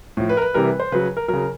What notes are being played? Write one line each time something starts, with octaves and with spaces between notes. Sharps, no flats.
A2 F3
B4
A#4
B4
C3 E3 G3 A#4
B4
C5
C#3 F#3 B4
A#4
C#3 F#3 A#4